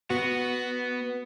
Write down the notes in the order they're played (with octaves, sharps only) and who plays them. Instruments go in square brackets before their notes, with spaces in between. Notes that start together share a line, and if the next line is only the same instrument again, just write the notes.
[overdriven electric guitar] B3 [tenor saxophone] F#4